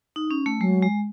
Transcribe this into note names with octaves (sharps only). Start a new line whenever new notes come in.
D#4
C#4
A3
F#3 G#3
G#3